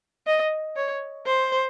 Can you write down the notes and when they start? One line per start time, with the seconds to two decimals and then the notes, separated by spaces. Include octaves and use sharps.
0.27 D#5
0.76 C#5
1.26 C5